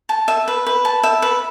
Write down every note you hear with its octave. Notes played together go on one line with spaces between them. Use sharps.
A5
E5
B4
B4
A5
E5
B4